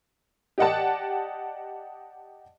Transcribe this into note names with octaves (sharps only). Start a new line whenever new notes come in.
G4 D5 D#5 F#5 G5 A5